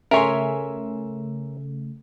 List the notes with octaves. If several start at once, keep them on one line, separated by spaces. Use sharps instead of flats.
C#3 A3 A#4 C#5 E5 G#5 C6